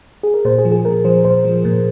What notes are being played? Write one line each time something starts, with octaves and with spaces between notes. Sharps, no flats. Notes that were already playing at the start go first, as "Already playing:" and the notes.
G#4
A#4
A#2 C5
G#4
F3
G#4
A#2 A#4
F3 C5
A#2 C5
F3
A#2